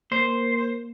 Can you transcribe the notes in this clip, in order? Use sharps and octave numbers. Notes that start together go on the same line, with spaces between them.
A#3 C5